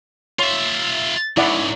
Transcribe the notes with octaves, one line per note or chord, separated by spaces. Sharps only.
F4 C#5 E5 C6
G#2 C#3 E4 D5 F#5